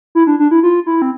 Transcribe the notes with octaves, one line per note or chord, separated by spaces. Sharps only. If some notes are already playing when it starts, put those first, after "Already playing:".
E4
D4
D4
E4
F4
E4
C4